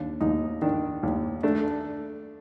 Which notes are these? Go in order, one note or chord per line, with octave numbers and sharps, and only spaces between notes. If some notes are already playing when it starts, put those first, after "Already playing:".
Already playing: D#2 D4
D#2 D#4
D#3 D4
D#2
A3 D4